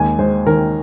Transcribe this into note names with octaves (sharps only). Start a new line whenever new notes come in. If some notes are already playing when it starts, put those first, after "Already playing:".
Already playing: D#2 G#3 G#5
G#3 C5
D#3 A#4